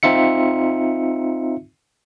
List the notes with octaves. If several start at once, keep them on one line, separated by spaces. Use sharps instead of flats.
C4 D#4 F4 E5 C#7